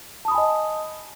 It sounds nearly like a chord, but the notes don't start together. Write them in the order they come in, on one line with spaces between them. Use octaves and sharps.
A5 D#6 B5 G#5 D#5